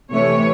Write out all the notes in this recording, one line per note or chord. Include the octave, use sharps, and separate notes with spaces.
C3 E3 A3 C#5